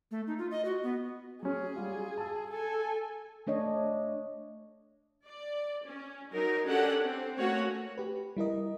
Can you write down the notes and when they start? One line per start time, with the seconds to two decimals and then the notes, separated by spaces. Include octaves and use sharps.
0.11 A3
0.27 D#4
0.38 F4
0.51 D#5
0.65 F#4
0.83 B3
1.43 F#3 C#4 G#4
1.74 G3 F4 F#4
2.18 A5 E6
2.51 A4 G#5
3.47 A3 D4 C#5 D#5
5.26 D5
5.86 C#4
6.31 F#3 D#4 A#4
6.66 C#4 D4 G4 A4 F#5
7.05 C4
7.37 A3 A#3 C#4 F#4 C#5 F#5
7.98 G4 B4
8.37 G3 E4 A#4 D#5